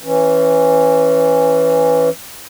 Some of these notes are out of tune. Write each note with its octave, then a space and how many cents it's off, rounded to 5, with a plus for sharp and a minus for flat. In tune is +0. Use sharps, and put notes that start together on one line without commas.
E3 +0 C#4 -15